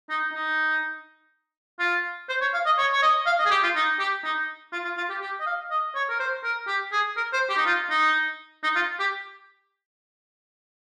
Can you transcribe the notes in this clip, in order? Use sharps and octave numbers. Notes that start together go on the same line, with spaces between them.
D#4
D#4
F4
C5
C#5
F5
D#5
C#5
C#5
D#5
F5
D#5
G#4
G4
F4
D#4
G4
D#4
F4
F4
F4
G4
G4
D#5
F5
D#5
C#5
A#4
C5
A#4
G4
G#4
A#4
C5
G4
D#4
F4
D#4
D#4
F4
G4